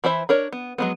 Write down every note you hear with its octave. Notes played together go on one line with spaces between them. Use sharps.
E3 E4 C5 E5
D4 A#4 C#5
B3
F#3 G#3 B3